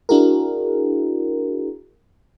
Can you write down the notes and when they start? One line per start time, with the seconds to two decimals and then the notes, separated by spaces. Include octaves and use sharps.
0.09 D4 E4 F#4 G#4 A#4